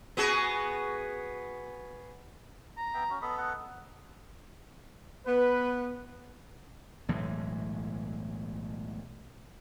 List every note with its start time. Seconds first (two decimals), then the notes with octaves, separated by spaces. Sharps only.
0.17 B3 F#4 G#4
2.77 A#5
2.94 B3 E5 G5
3.10 C#4 F#4
3.22 B3 A4 D#5 B5
3.38 F#5
5.27 B3 B4
7.09 B1 A2 E3 G#3